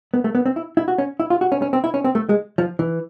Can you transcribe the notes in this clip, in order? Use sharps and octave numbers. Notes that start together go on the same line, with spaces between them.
B3
A3
B3
C4
E4
E4
F#4
C#4
E4
F4
F#4
C#4
C#4
C4
E4
C#4
C4
A3
G#3
F3
E3